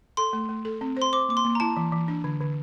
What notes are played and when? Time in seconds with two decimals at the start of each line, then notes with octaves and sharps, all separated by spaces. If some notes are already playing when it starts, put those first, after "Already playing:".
0.17 A4 C6
0.33 A3
0.49 A3
0.65 A4
0.81 C4
0.97 C5 C6
1.13 C5 D6
1.29 A#3 D6
1.37 C6
1.45 A#3
1.55 A#5
1.60 E4 A5
1.77 E3
1.92 E3
2.08 D4
2.24 D3
2.40 D3